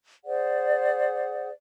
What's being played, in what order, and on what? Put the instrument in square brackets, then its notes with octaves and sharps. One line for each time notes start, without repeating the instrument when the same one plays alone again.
[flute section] G#4 C5 D5 F#5